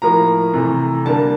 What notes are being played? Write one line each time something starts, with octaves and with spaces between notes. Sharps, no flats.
A2 F3 A#3 A#5
C3 E3 A3
D3 G3 A#3 A5